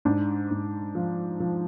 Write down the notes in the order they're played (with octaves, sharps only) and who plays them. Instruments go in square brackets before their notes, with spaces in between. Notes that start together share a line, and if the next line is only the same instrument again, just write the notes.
[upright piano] G#2 D4
G#2
F3
F3